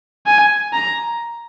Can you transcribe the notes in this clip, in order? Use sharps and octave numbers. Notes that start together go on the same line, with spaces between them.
G#5
A#5